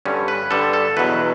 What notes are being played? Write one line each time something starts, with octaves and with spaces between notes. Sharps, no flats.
G2 D3 G3 C#4
B4
G2 D3 G3 A4
A4
E2 B2 F#3 B4